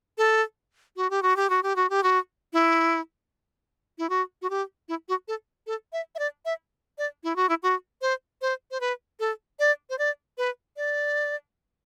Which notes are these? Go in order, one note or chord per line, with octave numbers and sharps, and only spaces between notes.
A4
F#4
G4
F#4
G4
F#4
G4
F#4
G4
F#4
E4
E4
F#4
F#4
G4
E4
F#4
A4
A4
E5
E5
D5
E5
D5
E4
F#4
E4
F#4
C5
C5
C5
B4
A4
D5
C5
D5
B4
D5